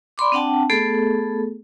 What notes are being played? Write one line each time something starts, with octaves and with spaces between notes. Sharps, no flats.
D5 B5 C6 D6
C4 D4 F#5 G5 A5
A3 B3 G#4 A4